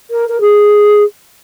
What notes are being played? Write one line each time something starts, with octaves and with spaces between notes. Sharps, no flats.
A#4
A#4
G#4